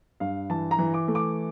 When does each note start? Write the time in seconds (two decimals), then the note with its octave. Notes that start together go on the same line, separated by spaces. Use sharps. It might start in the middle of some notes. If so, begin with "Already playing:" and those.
0.20 G2 F5
0.50 E3 A5
0.71 A#5
0.79 E3
0.94 D6
1.08 A3
1.15 D6